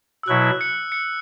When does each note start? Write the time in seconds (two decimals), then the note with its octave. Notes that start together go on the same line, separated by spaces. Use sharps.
0.23 E6
0.28 B2 F#3 E4 F#6
0.61 C#7
0.92 C#7